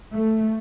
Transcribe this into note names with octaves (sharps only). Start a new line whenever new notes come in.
A3